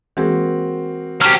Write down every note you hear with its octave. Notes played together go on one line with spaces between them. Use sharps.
E3 G#3 A#3 C4 F#4 G#4
F#3 G4 C5 A5 F6